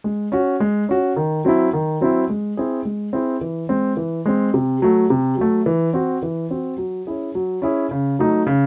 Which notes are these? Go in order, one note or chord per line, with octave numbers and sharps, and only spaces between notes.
G#3
C#4 F#4
G#3
C#4 F#4
D#3
F#3 C4 E4
D#3
F#3 C4 E4
G#3
C4 E4 G#4
G#3
C4 E4 G#4
E3
G#3 C4
E3
G#3 C4
C3
F#3 A3
C3
F#3 A3
E3
C4 F#4
E3
C4 F#4
F#3
C#4 E4 G#4
F#3
C#4 E4 G#4
C#3
F#3 A3 D#4
C#3